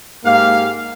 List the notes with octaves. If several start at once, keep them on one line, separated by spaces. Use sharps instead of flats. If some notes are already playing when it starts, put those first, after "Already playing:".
G#2 A#3 G4 F5